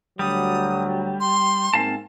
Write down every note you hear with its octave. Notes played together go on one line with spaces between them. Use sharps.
D2 F#3 G3 D#6
C6
G#2 A#3 C4 F5 G#5 A5